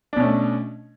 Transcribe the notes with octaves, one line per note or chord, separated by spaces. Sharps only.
B2 A3 C#4 D4